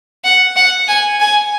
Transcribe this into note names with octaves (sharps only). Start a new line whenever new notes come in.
F#5
F#5
G#5
G#5